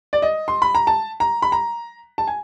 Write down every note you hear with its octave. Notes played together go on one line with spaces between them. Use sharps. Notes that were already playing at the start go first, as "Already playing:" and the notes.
D5
D#5
C6
B5
A#5
A5
A#5
B5
A#5
A5
G#5